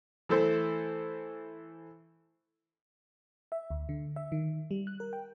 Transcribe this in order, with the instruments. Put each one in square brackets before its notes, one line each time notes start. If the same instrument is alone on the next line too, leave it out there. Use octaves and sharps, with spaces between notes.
[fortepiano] E3 A3 A4 C5
[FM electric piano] E5
D2
D3
E5
D#3
G3
F#6
A#4
G5